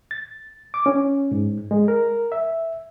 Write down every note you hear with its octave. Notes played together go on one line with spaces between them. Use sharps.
A6
D6
C#4
G#2
G#3
A#4
E5